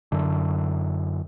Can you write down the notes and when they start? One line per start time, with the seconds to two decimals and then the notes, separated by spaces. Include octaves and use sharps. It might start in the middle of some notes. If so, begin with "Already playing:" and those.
0.12 F#2 D3